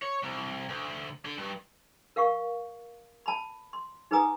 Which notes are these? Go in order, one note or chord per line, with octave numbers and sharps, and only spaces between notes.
C#5
C2
D2
D4 A4
G2
A#4 F5 F#5 C#6
A5 B5
C6
D#4 G#4 B4 G#5 A#5 D#6